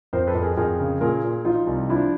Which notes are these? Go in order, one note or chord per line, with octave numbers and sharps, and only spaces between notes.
F2 A#4 C5
A4 B4
F2
G#4 A#4
F2 G#4 A#4
C#3
A#2 G#4 A#4
A#2
F3 D#4 F4
C2
F3 D4 E4